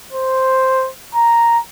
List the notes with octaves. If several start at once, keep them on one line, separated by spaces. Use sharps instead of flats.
C5
A#5